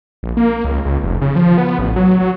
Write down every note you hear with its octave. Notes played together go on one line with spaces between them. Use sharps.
A#1
A#3
C#2
C#2
F1
C#3
F3
B3
A1
F#3
F#3